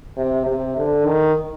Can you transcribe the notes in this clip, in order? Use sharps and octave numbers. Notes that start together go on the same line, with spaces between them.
C3
C3
D3
D#3